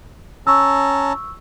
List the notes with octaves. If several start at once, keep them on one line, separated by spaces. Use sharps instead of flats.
C#4 A5 A#5 C#6 E6